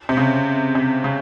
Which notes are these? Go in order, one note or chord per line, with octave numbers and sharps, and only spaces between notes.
C3
C#3
C3
C#3